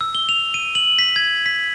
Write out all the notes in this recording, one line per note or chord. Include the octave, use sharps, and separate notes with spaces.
E6
G7
F7
D#7
F#7
B6
G#6
B6